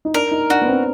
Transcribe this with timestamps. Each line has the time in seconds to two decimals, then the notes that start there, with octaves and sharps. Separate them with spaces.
0.05 D#4
0.14 D4 A#4
0.31 D#4
0.50 D4 F#4
0.61 B3
0.68 C4